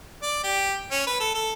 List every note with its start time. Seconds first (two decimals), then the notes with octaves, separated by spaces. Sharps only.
0.22 D5
0.44 G4
0.91 C#4
1.07 B4
1.20 A4
1.35 A4